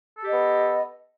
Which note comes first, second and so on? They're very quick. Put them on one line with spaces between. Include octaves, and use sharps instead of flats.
A4 G4 D#5 B3